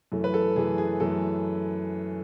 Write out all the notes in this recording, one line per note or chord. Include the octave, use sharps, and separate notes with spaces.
F#2 E3 A3
B4
A4
F#2 E3 A3 G#4
G#4
F#2 E3 A3 A4